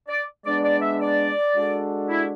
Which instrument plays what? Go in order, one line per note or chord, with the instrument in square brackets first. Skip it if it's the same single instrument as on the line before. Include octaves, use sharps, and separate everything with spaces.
[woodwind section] D5
[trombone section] G#3 B3 D4 [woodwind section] D5
[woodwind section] D5
E5
D5
[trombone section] G#3 D4 F#4 A4
[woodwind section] E4